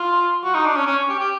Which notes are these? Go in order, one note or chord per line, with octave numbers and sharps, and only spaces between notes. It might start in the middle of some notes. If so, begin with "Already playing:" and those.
Already playing: F4
F#4
D#4
D4
C#4
C#4
G4
G4